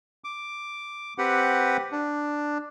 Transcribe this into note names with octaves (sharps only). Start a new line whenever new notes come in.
D6
C4 G4 B4 F#5
D4